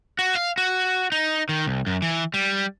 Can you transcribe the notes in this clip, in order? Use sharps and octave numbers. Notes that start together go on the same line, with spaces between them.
F#4
F5
F#4
D#4
D#3
C2
F#2
E3
G3